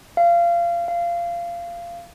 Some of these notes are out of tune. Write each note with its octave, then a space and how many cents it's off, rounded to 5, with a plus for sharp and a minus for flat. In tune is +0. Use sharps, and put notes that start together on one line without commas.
F5 -25
F5 -20